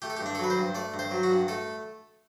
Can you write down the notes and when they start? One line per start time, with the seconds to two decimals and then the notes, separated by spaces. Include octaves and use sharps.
0.02 A3 G4
0.10 A4
0.17 G4
0.21 G2
0.26 D4
0.35 A4
0.39 F#3 B4
0.50 C5
0.57 G2
0.75 A3 D5
0.94 G2
0.99 C5
1.11 F#3
1.23 F#4
1.30 G2
1.48 A3 A4